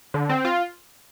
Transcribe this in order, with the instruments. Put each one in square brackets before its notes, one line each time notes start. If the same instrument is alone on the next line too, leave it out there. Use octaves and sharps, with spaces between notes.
[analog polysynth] D3
C4
F4